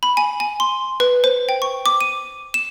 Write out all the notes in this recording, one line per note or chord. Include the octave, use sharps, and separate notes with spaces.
B5
G#5
G#5
C6
B4
C5
G5
C#6
D6
D#7
E7